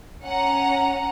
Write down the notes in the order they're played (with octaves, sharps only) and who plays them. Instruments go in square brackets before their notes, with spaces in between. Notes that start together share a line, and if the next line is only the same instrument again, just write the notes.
[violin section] C#4 F#5 A#5